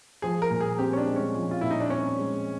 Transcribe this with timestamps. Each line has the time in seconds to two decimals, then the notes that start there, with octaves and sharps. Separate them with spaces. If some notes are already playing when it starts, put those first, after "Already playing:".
0.22 F3 G#4
0.42 A#4
0.50 A#2
0.61 G#4
0.79 C4 G4
0.93 C#4
0.97 D4
1.06 G#3
1.16 C#4
1.34 F3
1.51 F4
1.61 A#2 E4
1.70 D#4
1.80 D4
1.90 C4 C#4
2.19 G#3